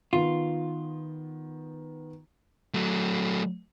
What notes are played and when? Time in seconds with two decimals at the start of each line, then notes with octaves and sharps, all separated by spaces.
0.13 D#3 B3 F4
2.74 F#3 A3